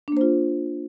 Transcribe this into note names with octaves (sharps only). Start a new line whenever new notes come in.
A#3 D4 F4 C5